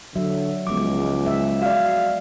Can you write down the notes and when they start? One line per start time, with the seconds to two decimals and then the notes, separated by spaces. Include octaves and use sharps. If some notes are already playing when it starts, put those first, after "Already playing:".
0.15 D3 F#3 E5
0.67 C#2 F3 G#3 B3 D6
1.26 E5
1.62 F#4 D5 F5